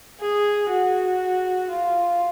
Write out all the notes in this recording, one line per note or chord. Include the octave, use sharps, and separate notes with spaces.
G#4
F#4
F4